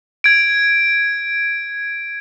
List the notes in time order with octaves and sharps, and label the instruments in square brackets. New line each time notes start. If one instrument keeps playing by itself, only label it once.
[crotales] G#6 D7